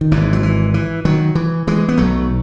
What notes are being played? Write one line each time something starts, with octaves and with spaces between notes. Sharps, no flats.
D#3
G#1 G#2 E3
F#3
E3
E3
D#3 F#3
E3
E3 G#3
B3
B1 B2 F#3 A3